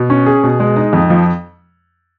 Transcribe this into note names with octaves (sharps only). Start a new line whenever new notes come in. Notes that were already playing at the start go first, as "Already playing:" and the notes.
Already playing: B2
C#4
G#4
B2
G#3
D#4
F2
F3